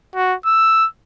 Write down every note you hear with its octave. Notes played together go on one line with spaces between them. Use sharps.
F#4
E6